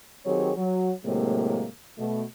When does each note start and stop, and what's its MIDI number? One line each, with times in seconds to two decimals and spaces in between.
0.24 0.50 51
0.24 0.50 54
0.24 0.50 60
0.24 0.50 67
0.24 0.50 68
0.24 0.50 73
0.56 0.91 54
1.04 1.65 45
1.04 1.65 48
1.04 1.65 54
1.04 1.65 56
1.04 1.65 58
1.97 2.22 47
1.97 2.22 57